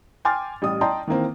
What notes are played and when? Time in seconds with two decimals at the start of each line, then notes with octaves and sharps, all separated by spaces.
0.25 G5 G#5 C6 D6 F6 A6
0.62 A1 G3 D#6
0.81 D5 D#5 G5 A5 A#5 C6
1.08 D#3 E3 A#3 C4